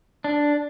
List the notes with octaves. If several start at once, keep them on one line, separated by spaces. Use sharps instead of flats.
D4